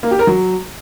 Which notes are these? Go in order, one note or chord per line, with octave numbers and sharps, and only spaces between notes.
A#3
G4
A#4
F#3